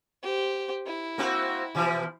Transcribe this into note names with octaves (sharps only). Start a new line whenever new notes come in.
G4 C5
E4
A#3 C4 F#4
B2 E3 F3